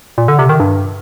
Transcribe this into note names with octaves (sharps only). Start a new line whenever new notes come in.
A#2
D3
C3
D#3
G2